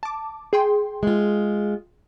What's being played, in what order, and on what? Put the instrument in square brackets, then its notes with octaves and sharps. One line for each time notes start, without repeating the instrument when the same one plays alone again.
[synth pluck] A5 D6
G#4 G5 C6
[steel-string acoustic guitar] G#3 F4